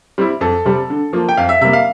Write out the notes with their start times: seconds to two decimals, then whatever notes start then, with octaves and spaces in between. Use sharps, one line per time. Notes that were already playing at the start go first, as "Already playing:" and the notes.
0.18 G3 C4 E4
0.41 F2 A4
0.65 C3 G3 C4
0.90 D3
1.13 F3 A#3 F4
1.29 G5
1.37 F2 F5
1.49 E5
1.61 C3 G3 A#3 E5
1.73 F5